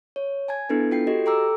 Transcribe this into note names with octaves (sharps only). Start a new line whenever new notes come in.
C#5
G#5 A5 G#6
B3 D4 E4 A4 B4
F4 G5 C7
F#4 G4 A4 D#5
A4 G5 A#5 D6 E6